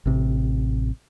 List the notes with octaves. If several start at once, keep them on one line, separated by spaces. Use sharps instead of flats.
A1 C3